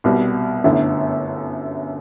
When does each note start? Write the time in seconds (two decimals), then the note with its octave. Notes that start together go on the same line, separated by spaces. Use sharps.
0.04 C2 B2 G3
0.64 G1 F#2 D3 A3 E4